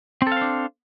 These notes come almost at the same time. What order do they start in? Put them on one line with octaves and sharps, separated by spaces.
C4 A4 F5 C5 D4